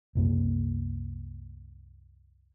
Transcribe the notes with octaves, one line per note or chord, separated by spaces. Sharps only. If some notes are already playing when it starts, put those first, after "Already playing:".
C2 F#2 A#3